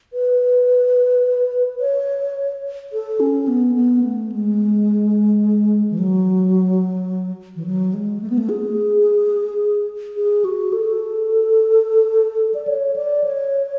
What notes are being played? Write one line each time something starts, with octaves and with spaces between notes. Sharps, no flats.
B4
C#5
A4
C#4
B3
B3
A3
G#3
E3
F#3
E3
F#3
G#3
A3
B3
A3
G#4
G#4
F#4
A4
D5
C#5
D5
C#5